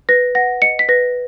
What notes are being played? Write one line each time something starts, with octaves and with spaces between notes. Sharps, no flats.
B4 A#6
F#5 A#6
D#5 C#7
B6
B4 A#6